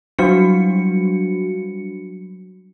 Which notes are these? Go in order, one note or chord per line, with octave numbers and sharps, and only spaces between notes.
F#3 G3 D4 F#4 C#7